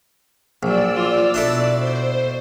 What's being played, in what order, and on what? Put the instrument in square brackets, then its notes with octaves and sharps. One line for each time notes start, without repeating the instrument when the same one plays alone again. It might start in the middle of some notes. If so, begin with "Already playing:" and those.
[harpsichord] A#1 [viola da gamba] F#3 [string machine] D5 E6
[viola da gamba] F4
[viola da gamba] B2 [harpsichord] D4 E4 A4
[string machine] C5